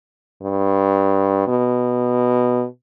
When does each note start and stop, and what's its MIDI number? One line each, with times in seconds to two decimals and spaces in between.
0.43 1.43 43
1.48 2.65 47